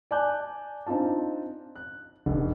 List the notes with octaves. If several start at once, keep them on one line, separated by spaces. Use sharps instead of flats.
D5 G#5 A5 D6 F#6 G6
C4 D4 D#4 F4 A5
F#6
F1 A#1